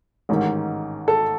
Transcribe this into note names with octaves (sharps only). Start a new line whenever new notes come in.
A1 G#2 D#3
A4